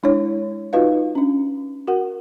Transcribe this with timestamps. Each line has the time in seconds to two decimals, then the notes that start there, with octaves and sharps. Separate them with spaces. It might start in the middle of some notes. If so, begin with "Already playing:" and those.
0.03 G#3 D4 E4 C#5
0.73 D#4 F4 F#4 B4 D#5 F5
1.15 C#4 D4
1.88 F#4 A#4 F#5